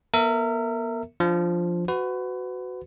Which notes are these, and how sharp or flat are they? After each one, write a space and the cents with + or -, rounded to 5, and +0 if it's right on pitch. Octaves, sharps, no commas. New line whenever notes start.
B3 -40 A#4 -30 E5 +0
F3 +0 D4 +0
F#4 +0 B4 +30